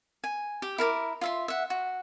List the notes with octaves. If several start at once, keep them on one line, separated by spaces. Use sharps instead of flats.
G#5
G4
E4 A#4 A5 D6
F4 E5 C6
E5 F#5
F#4